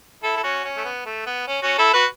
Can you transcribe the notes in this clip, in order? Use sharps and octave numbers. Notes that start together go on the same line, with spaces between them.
E4 A4
A4
C#4 F#4
C#4
A3
B3
A3
B3
C#4
C#4 F#4
E4 A4
F#4 B4